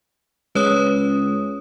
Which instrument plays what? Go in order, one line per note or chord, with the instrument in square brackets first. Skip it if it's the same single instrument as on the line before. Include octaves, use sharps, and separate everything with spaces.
[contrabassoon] C#2 [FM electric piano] G#3 G#4 [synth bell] B4 C#5 D#6